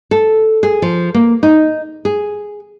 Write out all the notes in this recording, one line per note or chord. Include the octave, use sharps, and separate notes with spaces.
A4
G#4
F3
A#3
D#4
G#4